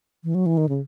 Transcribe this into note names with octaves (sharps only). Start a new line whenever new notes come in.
E3
F#3
E3
D#3
C#3